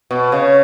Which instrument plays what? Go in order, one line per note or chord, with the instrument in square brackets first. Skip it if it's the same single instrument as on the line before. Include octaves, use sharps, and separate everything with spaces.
[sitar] B2
C#3